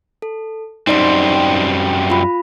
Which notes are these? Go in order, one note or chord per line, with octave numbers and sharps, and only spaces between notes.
A4
F#2 G3 C4 D#4 D5 C6
F4 B5